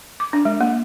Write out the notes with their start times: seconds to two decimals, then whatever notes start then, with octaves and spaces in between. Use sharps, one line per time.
0.20 D6
0.33 D4
0.45 G#3
0.61 A#3